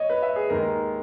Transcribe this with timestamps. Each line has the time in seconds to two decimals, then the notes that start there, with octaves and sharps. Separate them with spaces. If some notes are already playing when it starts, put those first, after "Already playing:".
Already playing: C#5 D#5
0.10 B4
0.22 E5
0.36 G#4
0.50 D#2 D#3 G#3 A#4